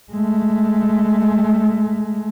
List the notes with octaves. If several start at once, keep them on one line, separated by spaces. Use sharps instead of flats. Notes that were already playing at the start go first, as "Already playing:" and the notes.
G#3 A3